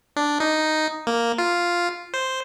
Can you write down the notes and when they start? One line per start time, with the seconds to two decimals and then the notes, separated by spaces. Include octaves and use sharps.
0.16 D4
0.40 D#4
1.07 A#3
1.38 F4
2.14 C5